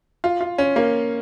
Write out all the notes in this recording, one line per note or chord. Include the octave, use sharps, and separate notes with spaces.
F4
F4
C#4
A#3